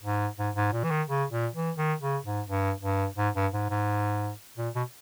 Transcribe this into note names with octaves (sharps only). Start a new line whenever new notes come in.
G#2
G#2
G#2
A#2
E3
D#3
C#3
A#2
E3
D#3
C#3
G#2
G2
G2
G#2
G2
G#2
G#2
A#2
B2